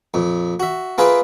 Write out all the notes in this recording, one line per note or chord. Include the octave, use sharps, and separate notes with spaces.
F2 A#2
F#4 E5
A#3 F4 G#4 B4 E5 G5